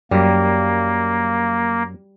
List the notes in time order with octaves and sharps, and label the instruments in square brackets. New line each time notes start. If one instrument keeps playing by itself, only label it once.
[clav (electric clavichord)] F#2 [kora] G3 [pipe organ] A#3